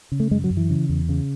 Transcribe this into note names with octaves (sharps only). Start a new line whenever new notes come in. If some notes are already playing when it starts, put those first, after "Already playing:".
C#3
A3
F#2 G#3
F#3
F#2
E3
C#3
E2
C#3